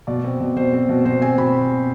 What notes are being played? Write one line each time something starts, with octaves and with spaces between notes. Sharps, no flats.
B2 D5
C4
B2
B2 C5
C4
B2
B2 C5
C4 G#5
B2 B5